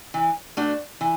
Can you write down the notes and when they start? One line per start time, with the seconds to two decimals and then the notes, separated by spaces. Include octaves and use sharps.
0.14 E3
0.57 A3 D4 F#4
1.01 E3